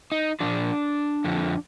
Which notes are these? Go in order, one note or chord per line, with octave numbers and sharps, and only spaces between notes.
D#4
A#2 F3 D4
F2 D3 F3